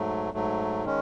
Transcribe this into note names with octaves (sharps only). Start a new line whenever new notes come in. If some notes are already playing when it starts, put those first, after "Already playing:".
Already playing: G#2 F#3 A3
G#2 F#3 A3
D#3 G#3 C#4